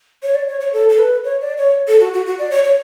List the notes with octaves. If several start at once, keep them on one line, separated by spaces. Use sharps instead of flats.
C#5
D5
C#5
C#5
A4
A4
B4
C#5
D5
C#5
A4
F#4
F#4
F#4
D5
C#5
C#5